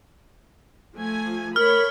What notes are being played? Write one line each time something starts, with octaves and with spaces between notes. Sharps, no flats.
F3 A3 G#5
A3 A#4 C#5 B5 F6